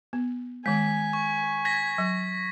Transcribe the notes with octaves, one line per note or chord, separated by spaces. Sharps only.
B3
D#3 G#3 G#5 B6
C#6
G#6 A#6 B6
F#3